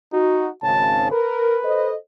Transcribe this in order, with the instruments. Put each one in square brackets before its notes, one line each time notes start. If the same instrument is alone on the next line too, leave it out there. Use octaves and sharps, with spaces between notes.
[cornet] D#4 [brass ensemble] F#4
[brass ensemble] G#1 C#3 [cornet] A5
[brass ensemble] A#4 [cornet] B4
[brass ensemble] A4 C5 D#5